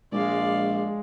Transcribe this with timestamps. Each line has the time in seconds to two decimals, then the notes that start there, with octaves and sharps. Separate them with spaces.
0.12 A#1 G#3 D5 F5